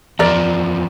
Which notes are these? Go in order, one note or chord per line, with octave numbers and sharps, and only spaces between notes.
E2 F3 A#4 D5 A#5